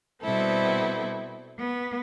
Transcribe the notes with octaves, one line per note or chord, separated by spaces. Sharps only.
B2 G3 B3 C4 E4 A4
B3